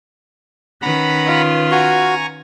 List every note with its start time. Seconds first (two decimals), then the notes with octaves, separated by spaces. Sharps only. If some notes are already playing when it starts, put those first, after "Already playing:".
0.82 D#3 C#4 B4 F#5 A#5 B5
1.25 F4
1.71 F#4 G#5 A#5 C#6